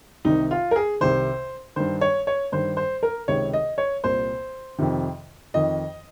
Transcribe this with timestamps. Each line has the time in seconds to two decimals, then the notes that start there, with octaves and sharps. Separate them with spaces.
0.25 C2 C3 D#3 D#4
0.51 F4
0.71 A#4
0.76 G#4
1.01 C2 C3 D#3 C5
1.76 G2 D#3 C5
2.01 C#5
2.27 C#5
2.52 G2 D#3 C5
2.77 C5
3.03 A#4
3.28 C#2 C3 D#3 C#5
3.53 D#5
3.78 C#5
4.04 C2 A#2 C5
4.79 F2 C3 D#3
5.54 F2 D#3 D#5